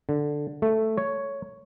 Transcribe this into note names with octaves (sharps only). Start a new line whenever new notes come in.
D3
A3
C#5